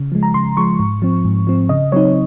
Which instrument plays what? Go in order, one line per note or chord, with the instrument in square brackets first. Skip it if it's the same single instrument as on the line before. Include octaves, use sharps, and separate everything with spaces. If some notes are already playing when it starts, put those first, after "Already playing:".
Already playing: [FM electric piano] C#3
F3 G#3
A#5
C#3 C6
F3 G#3 C#6
G#2
F3 C4
G#2
F3 C4
C#3 D#5
F#3 C4 D#4 C#5